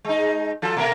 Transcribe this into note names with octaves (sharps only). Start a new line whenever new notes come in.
G#3 D#4
F3 F4 A4
B2 A3 A#4